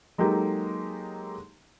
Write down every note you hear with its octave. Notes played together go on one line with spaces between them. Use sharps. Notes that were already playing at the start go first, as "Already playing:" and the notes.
F#3 G#3 A#3 D#4 G4 A4